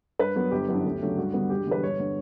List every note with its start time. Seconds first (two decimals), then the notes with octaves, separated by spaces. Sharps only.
0.19 G2 B4
0.35 F#3 B3
0.51 G1 G4
0.68 F#2 E3 B3 D4
0.85 D2
1.01 C#3 F#3 A3 D4
1.17 G2 F#4
1.34 D3 G3 B3
1.50 E1 G4
1.67 E2 D3 B4
1.83 G1 C#5
1.99 D3